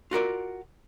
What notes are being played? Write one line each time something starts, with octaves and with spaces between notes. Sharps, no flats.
F4 F#4 A#4 D5